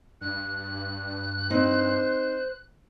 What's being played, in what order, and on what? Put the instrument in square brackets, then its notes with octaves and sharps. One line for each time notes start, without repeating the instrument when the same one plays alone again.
[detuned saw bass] G2 [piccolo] F#6
[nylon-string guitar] C4 D#4 [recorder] C5